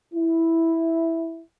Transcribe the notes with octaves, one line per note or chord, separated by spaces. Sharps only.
E4